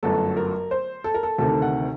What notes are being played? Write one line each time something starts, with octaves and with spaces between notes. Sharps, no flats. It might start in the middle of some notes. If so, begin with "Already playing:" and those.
G1 F#2 F#3 A3 A4
A#4
C5
A4
A#4
A4
D2 C3 D#3 A3 A4
F#5